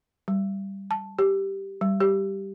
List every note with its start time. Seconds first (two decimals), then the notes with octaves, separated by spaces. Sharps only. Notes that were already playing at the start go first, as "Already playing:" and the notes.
0.28 G3
0.91 A5
1.19 G4
1.81 G3
2.00 G4